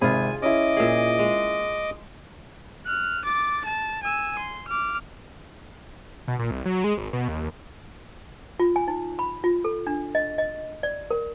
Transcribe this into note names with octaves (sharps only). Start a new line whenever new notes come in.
G#1 C3 F4 G#4 G#5 B5
C#4 E4 D#5 D6
A#2 G#4
G#3
F6 F#6
D6 A6
A5
G#5 E6
C6
D6 F6
B2
A#2
C2
F#3
G#3
G#1
B2
D#2
F4
G#5
D#4
B5
F4
A4
D4
D#5
D#5
D5
A#4